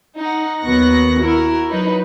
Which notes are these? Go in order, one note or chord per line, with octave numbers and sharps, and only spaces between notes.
D#4 F#5
D#2 F#3 B3 C#6 F#6 A#6
E4 F#4 A#4
F#3 D#4 B4